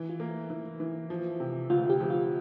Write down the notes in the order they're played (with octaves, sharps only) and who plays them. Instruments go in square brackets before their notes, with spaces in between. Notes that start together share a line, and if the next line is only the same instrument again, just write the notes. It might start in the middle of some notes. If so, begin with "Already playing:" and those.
Already playing: [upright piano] E3
[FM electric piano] F4
[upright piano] A#3
E3
E3
F3
C3
[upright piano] D2 [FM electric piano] F4
[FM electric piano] G4
[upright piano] F3
[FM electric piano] F4